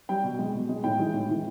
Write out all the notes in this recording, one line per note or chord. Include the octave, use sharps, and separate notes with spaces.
G3 G5
B2
G#3
B2
G#3
A2 G5
E3 G#3
A2
E3 G#3